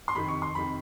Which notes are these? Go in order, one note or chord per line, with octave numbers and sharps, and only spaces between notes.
C6
F2 C3 D#3 B5
C#6
C6
F2 C3 D#3 B5